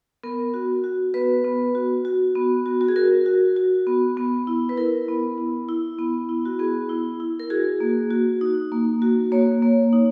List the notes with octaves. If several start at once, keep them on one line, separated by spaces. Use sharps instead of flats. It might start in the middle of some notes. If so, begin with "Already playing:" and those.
B3 A#4
F#4
F#4
B3 B4
B3
F#4
F#4
B3
F#4
F#4
G#4
F#4 A#4
F#4
F#4
B3
B3
E4
B4
E4 A#4
B3
E4
E4
B3
E4
F#4
B3 G#4
E4
E4
A#4
F#4 G#4
A#3
F#4
D#4
A#3
F#4
A#3 C#5
A#3
D#4